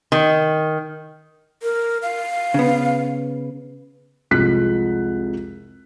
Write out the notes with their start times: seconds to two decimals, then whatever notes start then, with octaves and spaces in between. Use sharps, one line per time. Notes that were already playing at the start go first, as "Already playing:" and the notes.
0.12 D#3
1.63 A#4
2.02 F5
2.54 C#3 B3
4.31 C2 F2 G#3 F#6 B6